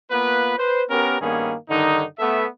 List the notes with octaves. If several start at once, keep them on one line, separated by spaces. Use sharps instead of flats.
A#3 B3 F4 B4
B4 C5
B3 C#4 G4 A#4
G2 D#3 A#3 B3 C#4 G#4
G2 D3 D#3 D#4
A3 B3 E5